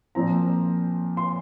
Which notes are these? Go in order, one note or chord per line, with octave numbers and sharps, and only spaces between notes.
A#2 F3 C4 A#5
C6